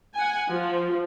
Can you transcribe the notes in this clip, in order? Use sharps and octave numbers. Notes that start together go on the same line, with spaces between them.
F#5 G#5
F3